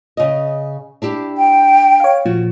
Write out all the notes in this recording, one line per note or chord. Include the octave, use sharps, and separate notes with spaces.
C#3 D#5
D4 E4 G4
G5
C#5 F5
A#2 F3 F#4